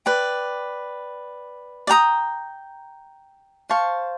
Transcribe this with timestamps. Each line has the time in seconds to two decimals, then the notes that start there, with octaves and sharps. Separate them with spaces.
0.06 B4 D5 G5
1.87 D5 G5 A#5 D#6
3.69 C5 F5 A5 C#6